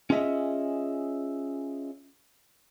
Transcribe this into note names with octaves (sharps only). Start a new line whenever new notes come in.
C#4 F4 G#4 D#5 E5